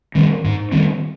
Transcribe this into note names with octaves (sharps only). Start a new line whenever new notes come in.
D#3 G3 C4
G#2
D#3 G3 C4